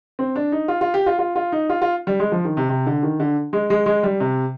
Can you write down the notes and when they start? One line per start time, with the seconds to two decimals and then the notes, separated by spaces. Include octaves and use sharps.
0.19 C4
0.36 D4
0.52 D#4
0.68 F4
0.81 F4
0.94 G4
1.06 F4
1.19 F4
1.36 F4
1.52 D#4
1.69 F4
1.82 F4
2.07 G3
2.20 G#3
2.32 F3
2.45 D#3
2.57 C3
2.69 C3
2.86 D3
3.03 D#3
3.20 D3
3.53 G#3
3.70 G#3
3.86 G#3
4.03 G3
4.20 C3